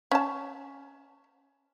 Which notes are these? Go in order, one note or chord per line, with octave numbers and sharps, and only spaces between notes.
C#4 A5